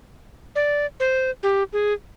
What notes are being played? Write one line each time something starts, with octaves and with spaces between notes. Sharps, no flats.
D5
C5
G4
G#4